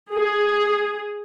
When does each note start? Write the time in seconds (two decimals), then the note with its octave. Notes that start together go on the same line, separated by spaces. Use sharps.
0.13 G#4